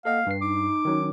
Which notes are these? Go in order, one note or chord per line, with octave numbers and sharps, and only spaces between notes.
A#3 A4 D#5 F5 F#5
G2 B4 C7
D#4 D6
D#3 F#3 C#4